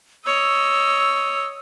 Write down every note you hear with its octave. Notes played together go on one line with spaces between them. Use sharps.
C#5 D#5 E6